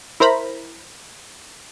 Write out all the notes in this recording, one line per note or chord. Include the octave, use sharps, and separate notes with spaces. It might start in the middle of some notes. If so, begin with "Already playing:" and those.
E4 A#4 C5 A#5 B5